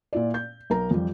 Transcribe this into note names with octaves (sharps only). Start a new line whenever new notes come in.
A#2 E4 D5
G6
B1 A#4 A#5
F2 G3